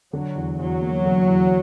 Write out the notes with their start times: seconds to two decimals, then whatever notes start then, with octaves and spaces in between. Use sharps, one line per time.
0.13 D3 F#3
0.35 E2
0.59 E2 F#3
0.82 A#3
1.05 D3
1.28 E2